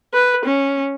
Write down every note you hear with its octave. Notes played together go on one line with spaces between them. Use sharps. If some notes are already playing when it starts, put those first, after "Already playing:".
B4
C#4